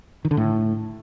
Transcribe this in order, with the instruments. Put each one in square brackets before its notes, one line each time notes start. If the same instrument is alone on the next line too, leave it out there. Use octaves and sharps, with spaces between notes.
[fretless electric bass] D#3
D3
A2